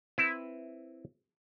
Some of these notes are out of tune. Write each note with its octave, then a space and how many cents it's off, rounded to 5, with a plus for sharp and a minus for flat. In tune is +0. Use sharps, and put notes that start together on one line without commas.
C4 +0 E4 +0 B4 +0